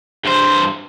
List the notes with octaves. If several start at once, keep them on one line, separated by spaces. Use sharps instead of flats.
G2 C5